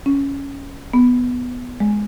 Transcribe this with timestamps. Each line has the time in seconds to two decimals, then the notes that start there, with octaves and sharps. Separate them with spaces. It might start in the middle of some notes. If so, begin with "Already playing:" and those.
0.06 C#4
0.93 B3
1.80 G#3